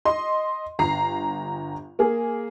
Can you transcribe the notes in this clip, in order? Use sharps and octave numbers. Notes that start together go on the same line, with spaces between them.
D#5 C6
G1 A#5 C7
A#3 G#4